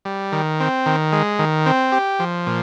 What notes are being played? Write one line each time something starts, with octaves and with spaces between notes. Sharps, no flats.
G3
D#3
C4
D#3
G#3
D#3
C4
G4
F3
A#2